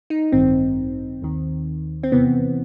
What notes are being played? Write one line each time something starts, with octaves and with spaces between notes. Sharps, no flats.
D#4
A1 G2 D#3 C4
D#2 D#3
C4
E2 C3 E3 B3